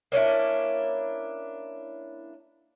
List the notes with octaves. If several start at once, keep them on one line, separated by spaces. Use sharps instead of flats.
A#3 C#4 D4 E4